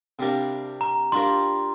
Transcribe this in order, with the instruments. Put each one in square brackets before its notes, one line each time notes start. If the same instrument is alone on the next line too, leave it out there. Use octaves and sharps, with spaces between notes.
[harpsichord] C3 G3 D4 A#4 F5
[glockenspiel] A#5
[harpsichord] G3 D4 F4 A#4 [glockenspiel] C6